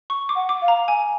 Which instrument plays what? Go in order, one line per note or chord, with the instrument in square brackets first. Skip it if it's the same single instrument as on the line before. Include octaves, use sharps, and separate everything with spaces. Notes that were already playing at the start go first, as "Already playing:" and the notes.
[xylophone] C#6
D6
[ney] F#5
[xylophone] D6
[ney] F5
[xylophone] A#5
G#5